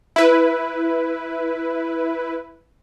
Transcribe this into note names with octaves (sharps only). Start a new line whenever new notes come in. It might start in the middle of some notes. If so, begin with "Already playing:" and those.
E4 B4